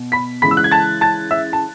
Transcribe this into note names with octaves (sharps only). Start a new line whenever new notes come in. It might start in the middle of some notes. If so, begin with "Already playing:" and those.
Already playing: B2
B5 B6
C#3 E3 G#3 B5 B6
E6
F#6
G#6
A5 A6
A5 A6
E5 E6
A5